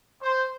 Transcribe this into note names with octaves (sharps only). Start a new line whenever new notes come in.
C5